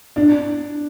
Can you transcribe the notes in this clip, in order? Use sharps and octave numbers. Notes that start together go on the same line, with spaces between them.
D4